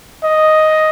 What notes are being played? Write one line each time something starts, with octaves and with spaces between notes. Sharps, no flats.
D#5